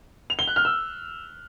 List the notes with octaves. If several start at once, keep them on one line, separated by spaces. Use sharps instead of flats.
F7
G7
F#6
F6
E6